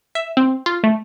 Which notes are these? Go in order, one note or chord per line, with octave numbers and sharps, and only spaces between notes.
E5
C4
F4
A3